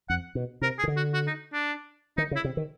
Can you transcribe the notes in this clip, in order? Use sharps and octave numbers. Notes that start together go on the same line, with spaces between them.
F2 F#5
B2
C3 A#4
G#4
C#3
D3
F#4
F#4
D#4
D4
D#3 D#4
C#3
E4
C3
D#3